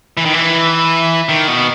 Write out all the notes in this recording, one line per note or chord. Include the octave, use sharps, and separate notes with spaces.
E3
D#3
E3
D#3
B2